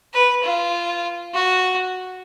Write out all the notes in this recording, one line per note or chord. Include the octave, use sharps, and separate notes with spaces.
B4
F4
F#4